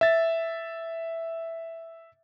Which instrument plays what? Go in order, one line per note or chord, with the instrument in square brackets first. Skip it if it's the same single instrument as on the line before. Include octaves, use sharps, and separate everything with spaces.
[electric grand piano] E5 A6